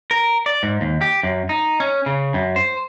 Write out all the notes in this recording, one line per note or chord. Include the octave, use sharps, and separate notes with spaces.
A#4
D5
G#2
D#2
G4
F#2
D#4
C#4
C#3
F#2
C5